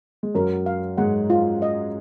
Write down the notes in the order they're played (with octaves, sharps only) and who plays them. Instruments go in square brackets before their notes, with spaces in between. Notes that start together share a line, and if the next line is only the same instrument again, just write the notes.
[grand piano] G#3
[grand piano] F#2 F#3 [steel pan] A#4
[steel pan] F5
[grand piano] G#2 G#3 [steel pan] F#5
[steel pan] F4
D#5